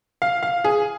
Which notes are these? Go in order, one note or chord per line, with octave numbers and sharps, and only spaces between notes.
F5
F5
G#4